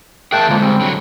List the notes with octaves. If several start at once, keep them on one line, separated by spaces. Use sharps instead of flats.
G#4 A#4 E5 G5 A5 F#6
D3 F3 G#3 A#3
G3 C4
D3 F#3